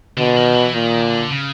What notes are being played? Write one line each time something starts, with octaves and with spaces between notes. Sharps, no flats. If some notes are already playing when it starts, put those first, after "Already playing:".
B2 D3
D#3
E3
A#2 D#3
D3
C#3